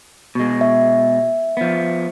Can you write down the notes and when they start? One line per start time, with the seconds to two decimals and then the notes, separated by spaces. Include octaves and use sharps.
0.35 B2 G#3
0.61 E5
1.57 F3 B3